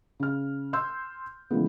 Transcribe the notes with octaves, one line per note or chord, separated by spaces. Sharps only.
C#3 F6
C6 E6 G6
C#3 E3 F3 G#3 A3 B3